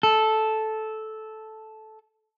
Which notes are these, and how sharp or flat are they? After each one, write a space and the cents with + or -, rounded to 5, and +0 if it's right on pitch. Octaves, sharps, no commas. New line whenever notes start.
A4 -10